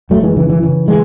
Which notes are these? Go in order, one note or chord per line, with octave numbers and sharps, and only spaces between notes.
F#2 F#3 A3
E3 G#3
C#3 E3
E3
C#3 E3
E3 G#3